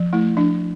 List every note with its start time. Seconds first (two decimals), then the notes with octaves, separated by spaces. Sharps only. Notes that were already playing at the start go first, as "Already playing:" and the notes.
Already playing: F3
0.13 A3 E4
0.36 F3 D4